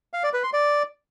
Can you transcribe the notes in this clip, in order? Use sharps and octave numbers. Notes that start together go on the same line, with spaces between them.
F5
D5
B4
C6
D5